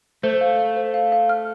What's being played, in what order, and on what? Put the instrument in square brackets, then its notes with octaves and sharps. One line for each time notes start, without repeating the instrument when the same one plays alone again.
[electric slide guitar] A3 [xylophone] C5
[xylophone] F5
F5
C5
F5
F5
F6